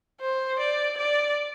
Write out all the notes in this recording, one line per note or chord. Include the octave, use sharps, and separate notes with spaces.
C5
D5
D5